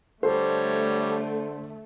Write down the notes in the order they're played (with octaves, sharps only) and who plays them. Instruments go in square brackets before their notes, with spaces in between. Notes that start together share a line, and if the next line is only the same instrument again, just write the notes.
[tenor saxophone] D3 [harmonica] G3 C#5 [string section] A3 [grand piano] A4 C5